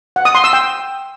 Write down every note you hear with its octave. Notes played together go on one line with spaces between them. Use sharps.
F#5
D#6
C6
E6
G5